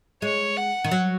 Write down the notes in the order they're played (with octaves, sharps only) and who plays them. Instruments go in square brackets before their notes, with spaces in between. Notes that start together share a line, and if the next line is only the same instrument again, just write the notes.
[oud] G#3 [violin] C#5
[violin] F#5
[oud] D#3
F#3